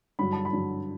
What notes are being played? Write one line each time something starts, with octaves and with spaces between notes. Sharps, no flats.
G2 D3 F#3 B5
A5
B5
G2 D3 F#3